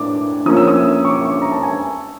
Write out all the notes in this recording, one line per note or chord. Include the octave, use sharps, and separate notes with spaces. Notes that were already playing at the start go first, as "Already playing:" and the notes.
Already playing: A2 D4 D6
F3 A#3 C#4 D#6
E6
D#6
C#6
D6
C#6
A#5
A5
G#5